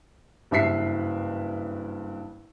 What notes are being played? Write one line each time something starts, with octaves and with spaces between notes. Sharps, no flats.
F#1 G2 E5 B6 C7